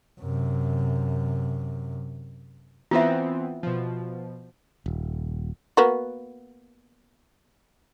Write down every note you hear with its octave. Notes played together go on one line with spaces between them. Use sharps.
F#2 C3
E3 B3 C4 F4 E5
B2 F3
D#1
A#3 B3 F#4